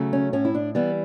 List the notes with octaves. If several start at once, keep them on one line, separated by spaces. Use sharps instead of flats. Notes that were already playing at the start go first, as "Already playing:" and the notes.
Already playing: C#3 F#3 A3
C#4
A2 C#4
E4
D4
E3 G3 B3